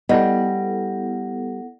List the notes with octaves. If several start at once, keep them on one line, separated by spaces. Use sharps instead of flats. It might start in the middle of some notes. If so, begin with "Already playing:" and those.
G3 B3 E4 A4 D#5 F#5 A#6